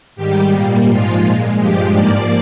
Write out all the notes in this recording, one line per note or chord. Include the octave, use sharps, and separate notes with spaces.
G#2 D#3 G3 G4
A#2 G3 A#3
G#2 F3 G#3 F4
A#2 G#3
G2 F3 G#3 G4
G#2 F3 A#3 D5